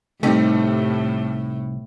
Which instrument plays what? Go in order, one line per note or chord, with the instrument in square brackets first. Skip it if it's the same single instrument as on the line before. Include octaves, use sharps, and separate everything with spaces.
[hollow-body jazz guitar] C2 C4 [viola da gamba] A2 [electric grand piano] G3 A3 [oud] D#4 G4